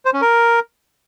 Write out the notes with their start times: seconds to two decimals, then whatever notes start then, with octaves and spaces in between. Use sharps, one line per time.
0.05 C5
0.13 C#4
0.22 A#4